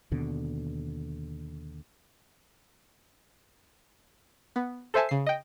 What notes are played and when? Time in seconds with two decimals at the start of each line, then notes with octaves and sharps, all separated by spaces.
0.12 D#2 B2 D3
4.56 B3
4.94 A4 C5 E5 G#5 A5
5.09 C#3 C7
5.27 D#5 G5